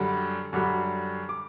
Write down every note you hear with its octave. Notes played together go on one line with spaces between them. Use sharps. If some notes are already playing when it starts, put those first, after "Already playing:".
Already playing: F#2 D3 G3
F#2 D3 G3
D6